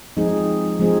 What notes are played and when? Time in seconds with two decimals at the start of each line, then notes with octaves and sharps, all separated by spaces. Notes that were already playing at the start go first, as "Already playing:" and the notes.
0.17 F3 G#3 C4 D#4 G#4
0.80 F3 G#3 C4 D#4 G#4